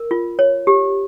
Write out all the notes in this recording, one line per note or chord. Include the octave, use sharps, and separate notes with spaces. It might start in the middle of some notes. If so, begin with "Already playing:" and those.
Already playing: A#4
F4
C#5
G4